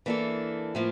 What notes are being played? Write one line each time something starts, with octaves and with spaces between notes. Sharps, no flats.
E3 A#3 D4 A4
A2 F3 A#3